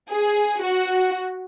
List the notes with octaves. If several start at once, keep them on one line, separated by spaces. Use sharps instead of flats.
G#4
F#4